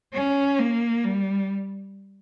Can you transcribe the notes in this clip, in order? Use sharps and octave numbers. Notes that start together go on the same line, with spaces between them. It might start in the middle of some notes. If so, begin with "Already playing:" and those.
C#4
A#3
G3